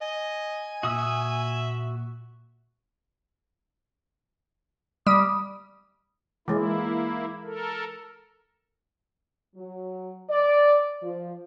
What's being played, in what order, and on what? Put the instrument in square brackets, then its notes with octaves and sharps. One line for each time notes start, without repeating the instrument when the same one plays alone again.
[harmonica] D#5 [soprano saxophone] G#5
[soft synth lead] A#2 [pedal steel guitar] F#4 D#6 E6 [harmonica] E5
[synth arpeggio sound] G3 [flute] D#6
[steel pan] E3 G#3 [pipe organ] A#3 E4
[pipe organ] A4 A#4
[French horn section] F#3
D5
F3